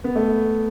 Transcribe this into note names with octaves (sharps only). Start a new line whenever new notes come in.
B3
A3